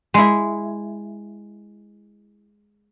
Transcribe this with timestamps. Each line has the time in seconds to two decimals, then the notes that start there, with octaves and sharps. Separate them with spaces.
0.14 G#3 E4